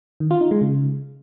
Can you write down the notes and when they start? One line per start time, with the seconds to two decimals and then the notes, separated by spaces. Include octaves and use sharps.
0.20 D#3
0.31 F4
0.41 D#4
0.51 G#3
0.61 C#3